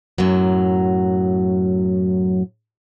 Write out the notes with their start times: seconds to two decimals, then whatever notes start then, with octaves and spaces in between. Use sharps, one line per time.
0.18 F#2 A2 F#3